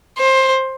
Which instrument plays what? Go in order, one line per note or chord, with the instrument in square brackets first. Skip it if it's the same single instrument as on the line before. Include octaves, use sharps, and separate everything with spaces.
[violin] C5